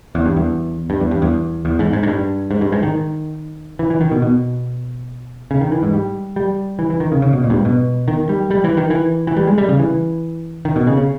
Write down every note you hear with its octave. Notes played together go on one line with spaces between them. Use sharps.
E2
G2
E2
G2
E2
G2
E2
E2
G#2
G#2
G#2
G2
G#2
G2
G#2
D#3
E3
E3
D#3
B2
B2
C#3
D#3
E3
G#2
G3
G3
E3
E3
D#3
C#3
C#3
B2
A#2
G2
G#2
B2
D#3
G3
G3
E3
D#3
E3
E3
G3
G#3
G3
C#3
E3
D#3
B2
C#3
C#3